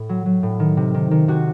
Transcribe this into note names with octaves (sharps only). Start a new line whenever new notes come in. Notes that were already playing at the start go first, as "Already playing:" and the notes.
Already playing: A2
F#3
F#3
A2
D#3
C3
D#3
D#3
C3 F#4